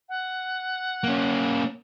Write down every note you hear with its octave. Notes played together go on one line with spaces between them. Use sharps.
F#5
A#3 C#4